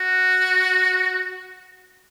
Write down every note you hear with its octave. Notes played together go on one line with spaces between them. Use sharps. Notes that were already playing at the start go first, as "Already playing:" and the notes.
Already playing: F#4